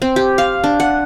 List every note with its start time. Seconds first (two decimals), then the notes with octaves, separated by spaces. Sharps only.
0.02 C4
0.16 G4
0.38 F5
0.64 D4
0.80 F#5